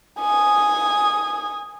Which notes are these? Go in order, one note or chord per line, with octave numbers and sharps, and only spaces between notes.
G#5 D#6